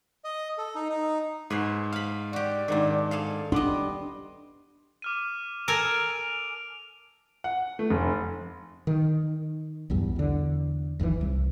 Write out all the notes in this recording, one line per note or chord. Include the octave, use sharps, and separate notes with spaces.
D#5
A4
D#4
D#4
G#2 G#4 B4 C#5 C7
F5 B5
F#4 G4 D5
G#2 D#3 C4 D4 D6
G#4 A4 F5
G3 B3 D4 D#5 C6 D6
D6 F6 D#7
A4 A#4 G#5 D7 F7
F#5
A3
F1
D#3
B1 E2 G2
E2 D3
F#1 D#2 C#3 E3
C2